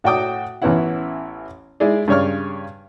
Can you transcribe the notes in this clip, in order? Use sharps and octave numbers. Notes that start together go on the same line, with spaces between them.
A2 F#4 D5 G5 D6 D#6
A1 E3 B3 C#4 E4 F#5
G#3 E4 G#4 D5
G2 C#3 C#5 D5 F6